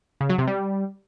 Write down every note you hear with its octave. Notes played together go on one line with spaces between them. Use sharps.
C#3
F#3
C3
G3